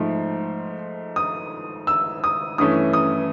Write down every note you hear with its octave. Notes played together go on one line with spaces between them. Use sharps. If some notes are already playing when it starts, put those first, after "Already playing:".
Already playing: G#2 F3 A3
D#6
E6
D#6
G2 E3 A3 C#4 D#6
D#6